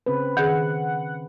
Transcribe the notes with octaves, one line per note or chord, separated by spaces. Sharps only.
C#3 C4 B4
D#3 G#4 F#5